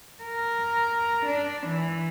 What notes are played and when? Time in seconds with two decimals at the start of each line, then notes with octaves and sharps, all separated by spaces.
0.24 A#4
1.26 D4
1.68 E3